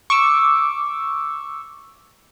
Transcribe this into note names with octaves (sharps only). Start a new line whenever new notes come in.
C#6 D6 E6